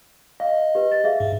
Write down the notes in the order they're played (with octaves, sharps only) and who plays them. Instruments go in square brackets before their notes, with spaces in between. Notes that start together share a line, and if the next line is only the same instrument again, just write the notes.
[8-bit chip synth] D#5 [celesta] F5
[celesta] G4 B4
A6
G#4 E5 F5
[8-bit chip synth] G#2